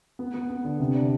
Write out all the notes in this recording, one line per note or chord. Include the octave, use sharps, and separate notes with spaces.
B3
B3
B3
D3
C3
D4